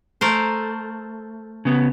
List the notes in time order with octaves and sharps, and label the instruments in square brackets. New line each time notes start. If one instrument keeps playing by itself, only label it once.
[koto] A3 A#4 C5
[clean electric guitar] C#3 B3